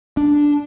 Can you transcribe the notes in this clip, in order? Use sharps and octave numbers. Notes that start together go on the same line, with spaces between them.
D4